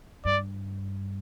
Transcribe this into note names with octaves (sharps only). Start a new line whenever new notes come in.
G2 D5